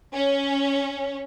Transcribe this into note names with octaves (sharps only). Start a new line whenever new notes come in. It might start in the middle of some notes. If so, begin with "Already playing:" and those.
C#4